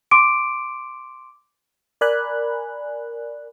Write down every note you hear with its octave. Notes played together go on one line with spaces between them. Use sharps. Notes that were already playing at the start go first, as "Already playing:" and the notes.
C6 D6 D7
A#4 D5 G#5 B5 F#6